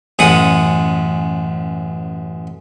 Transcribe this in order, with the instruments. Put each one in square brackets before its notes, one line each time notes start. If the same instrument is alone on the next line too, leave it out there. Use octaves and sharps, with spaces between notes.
[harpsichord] A1 F#2 G#3 F#5 D#6